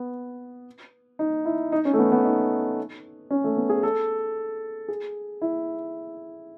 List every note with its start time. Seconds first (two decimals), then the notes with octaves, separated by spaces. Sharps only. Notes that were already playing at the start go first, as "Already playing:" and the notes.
Already playing: B3
1.19 D#4
1.45 E4
1.72 D#4
1.85 C#4
1.94 A3
1.99 B3
2.12 B3
2.25 D#4
3.31 C#4
3.44 A3
3.57 B3
3.69 G#4
3.83 A4
4.88 G#4
5.42 E4